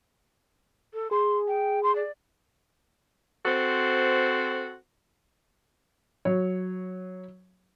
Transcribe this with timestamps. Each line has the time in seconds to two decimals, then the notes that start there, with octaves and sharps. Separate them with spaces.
0.93 A4
1.11 G#4 C6
1.48 G5
1.83 C6
1.96 D5
3.45 C4 F#4 A4 C5
6.25 F#3 C#5